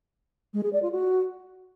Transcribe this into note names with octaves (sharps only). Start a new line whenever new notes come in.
G#3
G#4
D5
F4
F#4